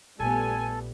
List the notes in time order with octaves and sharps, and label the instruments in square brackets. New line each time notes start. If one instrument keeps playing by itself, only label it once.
[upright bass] A#1 [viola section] G3 A3 B3 [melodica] A4 [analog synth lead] G#5